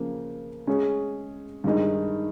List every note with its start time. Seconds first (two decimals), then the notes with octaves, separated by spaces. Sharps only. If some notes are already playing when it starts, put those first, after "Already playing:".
Already playing: C#3 F3 A#3
0.67 G#3 C#4 G#4 C#5
1.64 G2 D#3 G#3 D#4